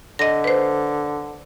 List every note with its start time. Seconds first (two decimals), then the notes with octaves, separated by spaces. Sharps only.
0.19 D3 D#5 A#6
0.44 B4 C5